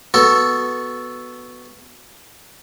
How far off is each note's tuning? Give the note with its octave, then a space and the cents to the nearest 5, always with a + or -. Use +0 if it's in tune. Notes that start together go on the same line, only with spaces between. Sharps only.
B3 +0 F#4 +0 A4 +0